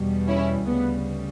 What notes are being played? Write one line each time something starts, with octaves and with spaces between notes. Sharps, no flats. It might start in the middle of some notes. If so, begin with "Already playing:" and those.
Already playing: E2 B2 G3
C#4 E4
D2 C#3 G3 B3